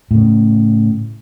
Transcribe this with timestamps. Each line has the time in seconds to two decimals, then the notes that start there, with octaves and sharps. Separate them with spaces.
0.11 A2 C#3